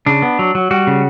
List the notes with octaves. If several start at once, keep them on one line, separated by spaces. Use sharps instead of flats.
C#3 D4
B3
F#3
F#3
G3 F#4
C#3